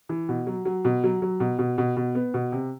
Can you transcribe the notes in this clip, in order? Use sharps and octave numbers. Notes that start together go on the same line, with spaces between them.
E3
B2
F#3
F#3
B2
F#3
F#3
B2
B2
B2
B2
B3
B2
C3